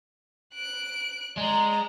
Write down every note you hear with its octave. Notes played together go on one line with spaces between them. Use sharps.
F#6 D7
G#3 D5 A#5